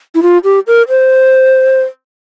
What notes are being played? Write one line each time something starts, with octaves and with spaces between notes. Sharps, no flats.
E4
F4
G4
A#4
C5